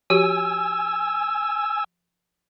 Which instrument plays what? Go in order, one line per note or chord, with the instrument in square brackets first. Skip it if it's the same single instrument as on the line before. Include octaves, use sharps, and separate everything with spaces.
[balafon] F3 F#4 G4 [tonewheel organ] G#5 E6